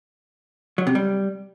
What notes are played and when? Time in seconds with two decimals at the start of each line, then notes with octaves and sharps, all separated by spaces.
0.78 F#3
0.87 C3
0.95 G3